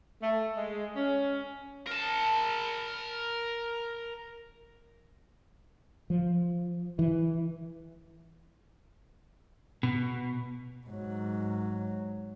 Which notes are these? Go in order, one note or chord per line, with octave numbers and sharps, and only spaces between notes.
A3
G#3
C#4
A#4 A5
F3
E3
B2
G#2 F#3